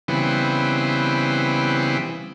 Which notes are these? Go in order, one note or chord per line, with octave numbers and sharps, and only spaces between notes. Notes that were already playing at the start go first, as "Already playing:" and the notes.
C#3 E3 G3 B3 C4